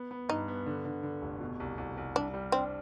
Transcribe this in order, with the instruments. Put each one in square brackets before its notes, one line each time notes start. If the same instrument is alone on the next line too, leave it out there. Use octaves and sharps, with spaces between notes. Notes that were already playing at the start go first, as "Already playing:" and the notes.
Already playing: [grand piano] B3
B3
[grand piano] G2 [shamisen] D#4
[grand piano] B3
D3
D3
D3
F1
B2
C2
C2
C2
[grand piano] G3 [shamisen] D4
[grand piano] G3
[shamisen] C4 [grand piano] D4